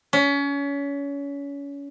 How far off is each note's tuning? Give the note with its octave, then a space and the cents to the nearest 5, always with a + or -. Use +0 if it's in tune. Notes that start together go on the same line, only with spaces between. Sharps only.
C#4 +30